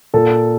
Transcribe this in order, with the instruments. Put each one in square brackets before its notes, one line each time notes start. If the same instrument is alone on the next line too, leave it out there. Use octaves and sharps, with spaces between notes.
[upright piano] A#2 A4